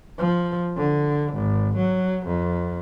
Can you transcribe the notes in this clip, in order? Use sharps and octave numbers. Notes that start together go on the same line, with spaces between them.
F3
D3
G#1
F#3
F2